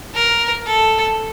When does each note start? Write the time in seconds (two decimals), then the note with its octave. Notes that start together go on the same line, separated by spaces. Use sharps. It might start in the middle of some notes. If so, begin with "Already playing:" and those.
0.15 A#4
0.66 A4